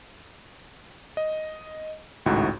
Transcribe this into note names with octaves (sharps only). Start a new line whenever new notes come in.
D#5
G#1 C#2 A2 D#4 F#4